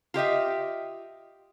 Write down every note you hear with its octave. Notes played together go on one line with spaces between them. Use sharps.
F4 G4 D#5 E5